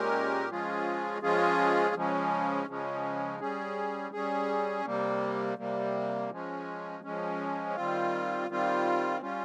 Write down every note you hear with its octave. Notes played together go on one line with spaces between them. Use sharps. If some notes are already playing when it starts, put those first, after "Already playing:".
Already playing: A#2 G#3 C#4 G4 A#4
F3 G#3 C#4 F4 G#4
F3 G#3 C#4 F4 G#4
C#3 F3 G#3 C#4
C#3 F3 G#3 C#4
G3 C#4 G#4
G3 C#4 G#4
C3 G3 A#3
C3 G3 A#3
F3 G#3 C#4
F3 G#3 C#4
D#3 G3 C4 F4
D#3 G3 C4 F4
G3 C#4 F4